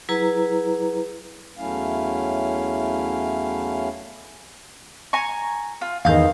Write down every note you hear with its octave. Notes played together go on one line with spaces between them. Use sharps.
F#3 E4 G#4 B4 A#5 E6
E2 F#3 A3 C#4 E4 F5
G#5 A#5 C#6
F4
E2 D#3 F5 G6